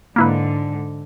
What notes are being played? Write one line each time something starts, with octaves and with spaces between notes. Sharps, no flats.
G#2 D3 A#3 E4 B4